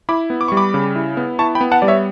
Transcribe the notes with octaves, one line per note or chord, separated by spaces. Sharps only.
E4 B5 D6
B3
D6
C#6
G3
B5 D6
C#3
E4
B3
E4 A5 C#6
G5 B5
B3
F#5 A5
G3 D5
C#5 E5